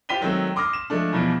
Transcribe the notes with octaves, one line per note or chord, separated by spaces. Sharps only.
F4 G4 C5 B6 D#7 G7
D#3 F#3 G#3 A3 C4
C6 D6 D#6 F6 A#6
E7
F3 G#3 A3 D4
E2 B2 E3 F3 G3